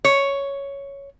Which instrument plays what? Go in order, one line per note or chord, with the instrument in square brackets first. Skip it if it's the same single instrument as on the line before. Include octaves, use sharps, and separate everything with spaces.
[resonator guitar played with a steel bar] C#5